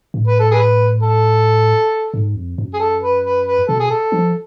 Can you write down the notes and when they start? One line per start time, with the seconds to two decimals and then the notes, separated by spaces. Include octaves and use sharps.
0.14 A2
0.27 B4
0.39 A4
0.51 G#4 B4
1.02 A4
2.14 G#2
2.35 F2
2.58 F#2
2.74 G#4
2.79 A4
3.03 B4
3.24 B4
3.46 B4
3.68 B2 A4
3.79 G#4
3.90 A4
4.12 F3